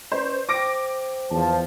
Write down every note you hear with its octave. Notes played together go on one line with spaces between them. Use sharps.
C#4 B4 C5 D5
C5 G5 D6 A#6 D7
E2 F3 A5